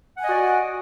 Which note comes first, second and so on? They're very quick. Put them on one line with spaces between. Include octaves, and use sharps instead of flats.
F#5 G#5 D#5 F#4 D5